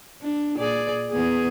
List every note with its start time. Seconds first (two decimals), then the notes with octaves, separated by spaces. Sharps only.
0.21 D4
0.57 A#2 G#4 D5
1.12 E2 B3 G#4